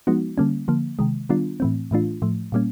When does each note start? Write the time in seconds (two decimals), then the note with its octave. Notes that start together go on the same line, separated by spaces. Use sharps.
0.07 F3 G#3 B3 D#4 F#4
0.38 D3 G3 A#3 C#4
0.68 D3 F3 A#3
0.99 C3 D#3 G#3
1.29 D#3 G3 B3 D4 F4
1.60 A2 E3 A3 C4
1.91 A2 E3 A3 D4 F4
2.22 A2 F3 A3
2.52 A#2 G3 A#3 C#4